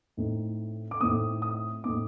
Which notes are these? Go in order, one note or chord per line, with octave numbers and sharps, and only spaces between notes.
A2 A3 C4 D#4
D6
A2 A3 C4 D#4 D#6
D#6
A2 A3 C4 D#4 D6